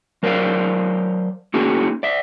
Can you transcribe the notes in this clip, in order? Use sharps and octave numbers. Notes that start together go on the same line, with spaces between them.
F#3 A#4 C5 D5 F5
A#3 C#4 D#4 F#4 G#4
D5 E5